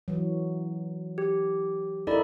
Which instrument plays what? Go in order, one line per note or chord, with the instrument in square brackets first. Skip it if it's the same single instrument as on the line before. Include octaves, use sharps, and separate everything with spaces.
[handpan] E3 F#3
[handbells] G4
[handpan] D#4 E4 A#4 [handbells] A4 D5 B5